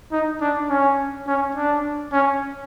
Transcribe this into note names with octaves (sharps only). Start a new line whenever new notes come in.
D#4
D4
C#4
C#4
D4
C#4